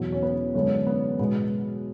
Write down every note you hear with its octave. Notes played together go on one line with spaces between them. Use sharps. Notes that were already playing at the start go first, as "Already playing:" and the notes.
Already playing: E2 B2 F#3
C#4
B3
F#2 D3 G#3 B3 C#4
B3
B2 G#3 B3